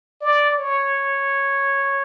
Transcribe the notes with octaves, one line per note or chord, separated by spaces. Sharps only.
D5
C#5